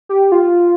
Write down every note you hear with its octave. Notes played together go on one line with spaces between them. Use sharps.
G4
F4